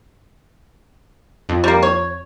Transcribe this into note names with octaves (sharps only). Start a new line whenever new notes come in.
F2
G3 A#3
C#5